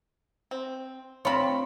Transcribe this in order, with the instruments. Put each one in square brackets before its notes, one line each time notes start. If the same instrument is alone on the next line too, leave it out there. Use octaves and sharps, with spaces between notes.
[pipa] C4
[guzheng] C4 F4 [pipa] C#5 B5